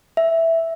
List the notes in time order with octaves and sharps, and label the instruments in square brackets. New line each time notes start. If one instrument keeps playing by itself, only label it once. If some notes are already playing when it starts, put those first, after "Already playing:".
[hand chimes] E5